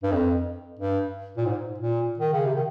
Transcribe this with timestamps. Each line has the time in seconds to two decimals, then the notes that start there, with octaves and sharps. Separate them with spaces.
0.03 G2
0.12 F2
0.79 G2
1.37 A#2
1.46 G#2
1.79 A#2
2.19 D#3
2.33 C#3
2.46 C3
2.55 D#3